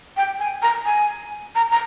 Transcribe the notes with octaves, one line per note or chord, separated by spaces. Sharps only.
G5
G#5
A#5
G#5
A#5
A#5